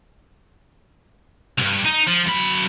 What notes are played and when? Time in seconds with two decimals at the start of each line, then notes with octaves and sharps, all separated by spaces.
1.58 C#2 G2
1.85 D#4
2.07 F3
2.27 F#2 B5